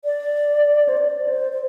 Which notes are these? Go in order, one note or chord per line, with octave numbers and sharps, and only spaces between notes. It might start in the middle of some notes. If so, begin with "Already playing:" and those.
D5
C5
D5
C5
C5